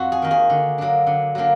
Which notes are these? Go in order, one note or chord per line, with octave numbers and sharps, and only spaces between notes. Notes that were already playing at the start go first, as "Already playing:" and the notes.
Already playing: F2 F#4
G#4
D#3 A#3
G#4
D3
F#3 A#3 D4
D3
F#3 A#3 D4